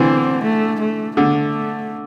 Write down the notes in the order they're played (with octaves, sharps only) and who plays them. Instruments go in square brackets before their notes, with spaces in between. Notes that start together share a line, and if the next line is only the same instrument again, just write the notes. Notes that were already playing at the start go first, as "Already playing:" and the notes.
Already playing: [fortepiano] D3 E3 [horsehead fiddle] C4
[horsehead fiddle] A3
A3
[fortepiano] D3 [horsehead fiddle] A3